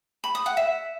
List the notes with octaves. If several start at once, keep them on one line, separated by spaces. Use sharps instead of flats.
B5
D#6
F#5
E5